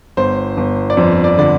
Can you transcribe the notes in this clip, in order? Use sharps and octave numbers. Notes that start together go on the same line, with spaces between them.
G1 C5
G1
D5
F2 C5
D5
D3 D5